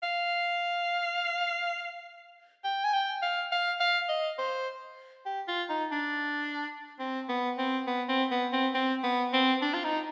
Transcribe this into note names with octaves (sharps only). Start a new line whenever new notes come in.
F5
G5
G#5
G5
F5
F5
F5
D#5
C5
G4
F4
D#4
D4
C4
B3
C4
B3
C4
B3
C4
C4
B3
C4
D4
F4
D#4